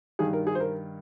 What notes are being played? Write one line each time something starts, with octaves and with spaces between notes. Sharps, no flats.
G2 D#3 G#4
A#4
G#4
C5
A#4